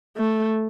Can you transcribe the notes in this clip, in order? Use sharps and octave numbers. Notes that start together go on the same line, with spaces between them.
A3